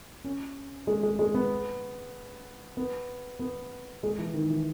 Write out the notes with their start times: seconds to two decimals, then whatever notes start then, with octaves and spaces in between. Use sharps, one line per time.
0.24 C#4
0.87 G#3
1.03 G#3
1.19 G#3
1.34 B3
2.77 B3
3.40 B3
4.03 G#3
4.18 E3
4.34 D#3
4.50 E3